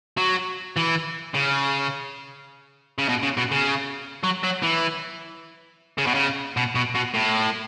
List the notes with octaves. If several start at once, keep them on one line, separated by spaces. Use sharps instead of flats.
F#3
E3
C#3
C#3
B2
C#3
B2
C#3
F#3
F#3
E3
C#3
B2
C#3
B2
B2
B2
A2